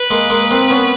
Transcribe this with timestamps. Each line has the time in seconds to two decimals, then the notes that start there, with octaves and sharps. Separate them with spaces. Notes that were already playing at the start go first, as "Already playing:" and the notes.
Already playing: B4
0.11 G#3 A#3
0.30 G#3 A#3
0.51 A#3 C4
0.70 B3 C#4